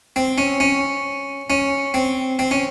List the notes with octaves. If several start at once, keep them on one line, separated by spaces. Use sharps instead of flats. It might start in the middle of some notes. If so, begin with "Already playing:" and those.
C4
C#4
C#4
C#4
C4
C4
C#4